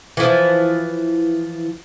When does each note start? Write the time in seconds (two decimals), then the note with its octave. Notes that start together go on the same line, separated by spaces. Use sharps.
0.17 E3 F3